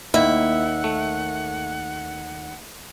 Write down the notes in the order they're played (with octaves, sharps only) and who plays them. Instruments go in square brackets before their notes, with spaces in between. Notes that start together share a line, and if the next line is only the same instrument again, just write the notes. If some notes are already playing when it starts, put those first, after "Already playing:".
[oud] D#2 A#3 [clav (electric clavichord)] E4 [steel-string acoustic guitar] E5 [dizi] F#5
[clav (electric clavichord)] A3